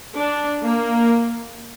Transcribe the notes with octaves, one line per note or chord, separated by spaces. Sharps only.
D4
A#3